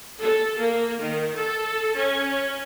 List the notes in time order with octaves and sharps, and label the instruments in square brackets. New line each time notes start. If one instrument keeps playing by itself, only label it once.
[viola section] A4
A#3
D#3
A4
C#4